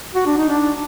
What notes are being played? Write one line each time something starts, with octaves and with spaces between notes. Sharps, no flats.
F#4
D4
D#4
D4